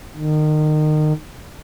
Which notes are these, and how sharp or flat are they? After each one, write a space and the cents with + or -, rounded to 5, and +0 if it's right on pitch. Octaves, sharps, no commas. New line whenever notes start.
D#3 -30